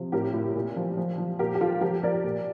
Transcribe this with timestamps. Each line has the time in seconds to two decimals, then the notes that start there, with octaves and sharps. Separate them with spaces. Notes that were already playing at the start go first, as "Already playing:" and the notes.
Already playing: C3 F3
0.12 A2 G4 A#4
0.34 A2
0.56 A#2
0.76 F3
0.97 F3
1.18 F3
1.39 A#2 G4 A#4
1.55 G4
1.60 F3 F4 A4
1.81 F3 G4 A#4
2.03 F3 A#4 D5
2.24 A#2